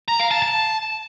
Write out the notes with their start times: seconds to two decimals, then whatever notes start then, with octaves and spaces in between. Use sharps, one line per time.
0.08 A#5
0.20 F5
0.31 A5
0.42 A5